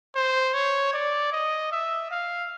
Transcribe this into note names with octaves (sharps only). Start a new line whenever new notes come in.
C5
C#5
D5
D#5
E5
F5